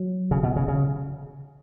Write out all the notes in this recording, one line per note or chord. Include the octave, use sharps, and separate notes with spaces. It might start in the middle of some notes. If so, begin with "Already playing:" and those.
Already playing: F#3
C#3
B2
C#3
C#3